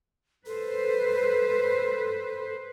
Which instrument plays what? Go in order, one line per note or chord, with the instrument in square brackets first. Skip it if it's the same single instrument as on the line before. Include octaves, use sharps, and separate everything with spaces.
[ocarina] A4 [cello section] B4 C5